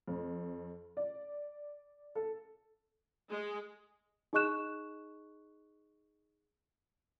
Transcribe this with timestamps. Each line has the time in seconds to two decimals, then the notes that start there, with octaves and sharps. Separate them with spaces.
0.08 F2
0.97 D5
2.15 A4
3.30 G#3
4.33 D#4 G#4 D#5 C#6 F#6 E7